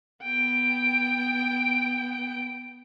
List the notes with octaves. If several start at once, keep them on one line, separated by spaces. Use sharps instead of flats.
B3 G5